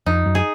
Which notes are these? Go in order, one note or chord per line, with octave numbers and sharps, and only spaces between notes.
F2 D#4
F#2
G#4